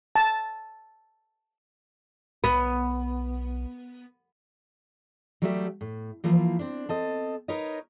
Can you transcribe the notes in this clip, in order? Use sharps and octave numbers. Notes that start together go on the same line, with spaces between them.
A5
B1 B3
F#3 G3 A3 G4 C5 E5
A2
E3 F3 A#3 E4
C4 D4
C4 A4 D#5
D#4 A#4 B4 C#5 D#5